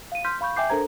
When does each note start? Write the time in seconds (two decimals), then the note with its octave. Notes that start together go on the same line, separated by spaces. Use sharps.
0.12 F5 D#7
0.24 C6 F6 G6 B6
0.41 F5 B5 C#6 G6
0.56 E5 G5 G#5 D6 G6 C7
0.69 D4 A4 A#4 C5 A#5 G#6